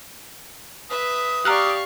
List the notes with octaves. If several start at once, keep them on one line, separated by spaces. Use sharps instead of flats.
B4 E5 D#6
G4 D5 F5 A#5 C#6 F6 F#6